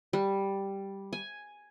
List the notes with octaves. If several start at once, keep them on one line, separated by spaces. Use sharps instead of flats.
G3
G#5